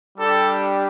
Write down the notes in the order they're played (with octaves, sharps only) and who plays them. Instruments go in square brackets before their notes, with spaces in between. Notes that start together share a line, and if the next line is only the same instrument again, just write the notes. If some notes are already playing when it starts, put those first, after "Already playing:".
[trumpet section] G3 D4 G4 A4